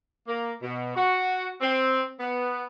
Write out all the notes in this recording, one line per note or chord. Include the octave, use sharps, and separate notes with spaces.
A#3
B2
F#4
C4
B3